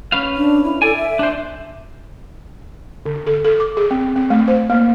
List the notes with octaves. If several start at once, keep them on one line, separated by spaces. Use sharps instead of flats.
C#4 B4 F5
D4
E4
A4 D5 G#5
E5
D4 C5
D3
A4
A4
D6
G#4
C4
C4
A3
C5
A#3